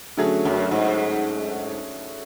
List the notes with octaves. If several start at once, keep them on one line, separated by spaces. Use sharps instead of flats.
D3 F#3 A3 C#4 G#4
F#2
G#2